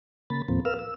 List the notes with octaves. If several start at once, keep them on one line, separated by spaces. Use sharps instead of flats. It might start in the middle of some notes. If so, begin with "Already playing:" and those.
C#3 A#3 B5 A6
D#2 A2 F3 A#3 C4
A#4 B4 F5 E6 F6
E6